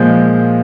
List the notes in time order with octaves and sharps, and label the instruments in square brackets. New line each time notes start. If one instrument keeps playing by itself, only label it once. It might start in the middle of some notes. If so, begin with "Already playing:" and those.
Already playing: [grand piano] A#2 F3 G#3 G6